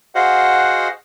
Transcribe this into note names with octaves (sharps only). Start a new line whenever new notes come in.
F#4 G#4 C5 D#5 F5 F#5